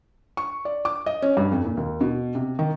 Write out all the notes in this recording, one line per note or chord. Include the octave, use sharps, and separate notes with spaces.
C#6
D5
D6
D#5
C#4
G2
F2
A#2
D#2
B2
C3
D#3